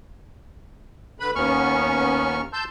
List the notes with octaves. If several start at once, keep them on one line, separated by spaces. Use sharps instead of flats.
D3 B4 B5
D#2 B3 C#4 C#6 F6
A5 C6 E6 G6